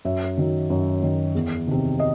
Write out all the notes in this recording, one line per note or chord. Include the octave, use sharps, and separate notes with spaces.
F#2 E5
D#3 F#3
F#2
D#3 F#3
E2
C3 D#3
D#5